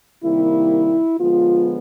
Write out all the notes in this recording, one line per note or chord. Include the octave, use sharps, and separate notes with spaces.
C3 D#3 G3 A#3 E4
D3 F3 G#3 B3 F4